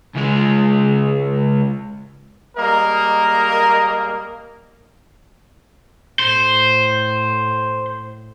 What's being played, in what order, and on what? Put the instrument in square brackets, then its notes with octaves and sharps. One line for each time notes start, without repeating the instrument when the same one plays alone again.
[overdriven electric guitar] C#2 G#3
[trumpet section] G3 G#3 A#3 A#4 D#5
[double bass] A2 [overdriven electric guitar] C5